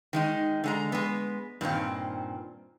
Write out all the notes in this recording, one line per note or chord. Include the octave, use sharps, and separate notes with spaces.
D#3 G#3 D#4
D3 G#3 A#5
G#3 B3
G2 A#2 D#3 C4